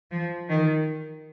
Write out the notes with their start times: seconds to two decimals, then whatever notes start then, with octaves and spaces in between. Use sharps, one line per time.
0.11 F3
0.49 D#3